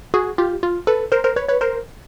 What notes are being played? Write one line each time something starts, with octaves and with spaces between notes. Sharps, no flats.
F#4 G#4
F4 G4
F4
A4 B4
A#4 C5
A#4 C5
B4 C#5
B4 C#5
A#4 C5